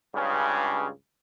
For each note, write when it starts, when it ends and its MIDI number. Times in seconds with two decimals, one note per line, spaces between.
0.14 0.87 37
0.14 0.87 43
0.14 0.87 49